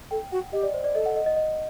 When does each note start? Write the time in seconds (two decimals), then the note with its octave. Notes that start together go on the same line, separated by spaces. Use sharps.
0.11 A4 G5
0.32 F#4 F#5
0.52 G4 D#5
0.63 D5
0.74 C5
0.84 D5
0.95 A4 D#5
1.06 F#5
1.16 D#5
1.26 D#5
1.37 D#5